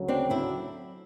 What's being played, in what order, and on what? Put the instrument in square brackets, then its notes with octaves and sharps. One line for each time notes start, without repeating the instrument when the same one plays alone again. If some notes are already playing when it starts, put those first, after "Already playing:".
Already playing: [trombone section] D2 C#3 F#3
[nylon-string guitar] C4 D4
D4 E4